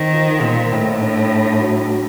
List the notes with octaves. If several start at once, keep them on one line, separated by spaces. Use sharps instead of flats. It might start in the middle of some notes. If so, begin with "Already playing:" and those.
Already playing: D#3 C4
F3
A#2 G3
A2 D#3
D4
G4
F#3
F#3